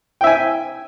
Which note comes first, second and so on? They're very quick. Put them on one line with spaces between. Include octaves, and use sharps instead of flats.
G5 E5 G#5